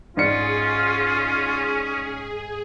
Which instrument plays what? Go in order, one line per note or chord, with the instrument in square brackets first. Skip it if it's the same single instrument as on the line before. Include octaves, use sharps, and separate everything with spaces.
[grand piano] G#2 D5 C#7 [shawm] C#4 [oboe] F4 [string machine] G#4